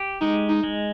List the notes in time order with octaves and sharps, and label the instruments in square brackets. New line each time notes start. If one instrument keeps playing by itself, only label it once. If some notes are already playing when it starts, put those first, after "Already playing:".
Already playing: [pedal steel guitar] G4
[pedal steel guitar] G#3 [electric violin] D#4
[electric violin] D#4
[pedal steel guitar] G#3